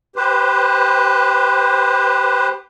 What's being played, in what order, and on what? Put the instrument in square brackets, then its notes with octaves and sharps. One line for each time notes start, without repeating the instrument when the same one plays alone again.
[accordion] G4 B4 C5